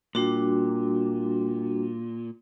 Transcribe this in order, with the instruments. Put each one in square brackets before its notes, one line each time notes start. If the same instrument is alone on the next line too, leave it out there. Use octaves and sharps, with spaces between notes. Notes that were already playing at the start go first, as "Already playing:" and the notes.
[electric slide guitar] A#2 [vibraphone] G3 D4 F#4